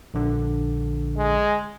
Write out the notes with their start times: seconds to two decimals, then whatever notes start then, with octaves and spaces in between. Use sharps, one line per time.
0.14 A#1 D3
1.17 G#3